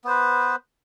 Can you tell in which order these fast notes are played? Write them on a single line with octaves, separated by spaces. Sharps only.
B3 C5 B4